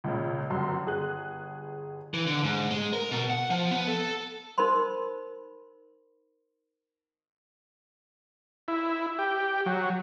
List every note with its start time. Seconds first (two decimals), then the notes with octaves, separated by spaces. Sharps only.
0.04 C#2 A#2 C#3
0.50 G1 F#2 C6
0.86 G1 G#4 F#6
2.14 E3
2.27 D3
2.44 G#2
2.71 G#3
2.93 A#4
3.11 B2
3.30 F#5
3.50 F3
3.71 B3
3.88 A4
4.58 D#4 A#4 C5 B5 C6
8.68 E4
9.19 G4
9.66 F#3